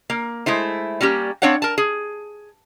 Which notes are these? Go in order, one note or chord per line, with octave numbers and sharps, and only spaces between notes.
A#3
G#3 A3 E4 C5
G3 A#3 C#4 G4
C4 D4 C#5 F5 F#5
A#4 A5
G#4